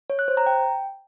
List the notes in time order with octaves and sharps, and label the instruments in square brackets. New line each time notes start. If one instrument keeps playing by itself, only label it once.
[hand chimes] C#5
F#6
C5
A#5
G5